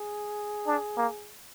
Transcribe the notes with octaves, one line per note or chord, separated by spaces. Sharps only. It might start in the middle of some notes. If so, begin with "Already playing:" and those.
Already playing: G#4
D4
A#3